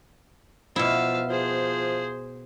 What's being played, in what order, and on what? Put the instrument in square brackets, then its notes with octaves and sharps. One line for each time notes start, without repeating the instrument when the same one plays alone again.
[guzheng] B2 E4 [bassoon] F3 [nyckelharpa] E5 F5
[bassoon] F3 [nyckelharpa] G#4 C5